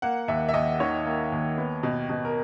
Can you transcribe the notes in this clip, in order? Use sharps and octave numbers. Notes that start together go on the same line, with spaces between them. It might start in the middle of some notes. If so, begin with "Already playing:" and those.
A#3 F#5
D#2 E5
E5
D#2 D#5
D#3 C#5
A#3
D#2
B3
B2
B2
A#4